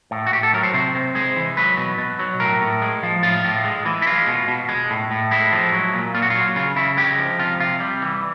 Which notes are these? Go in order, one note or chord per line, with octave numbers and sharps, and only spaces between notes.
A2
F#4
A2 G4
A4
F#3 A#4
C5
C3 C5
C3
G#3 C5
E3
F#3 B4
B2
B2
F#3
A2 A#4
A2
G#3
F3
A2 F4
A2
G#3
E3
E4
G#3 F4
B2
B2
G#3
A2
A2
G#3 E4
F3
F#3
A#2
A#2 F4
F#4
F4
F#3
C#3 F4
C#3 E4
G#3 G4
F3
C3 F4
C3 F4
G3
E3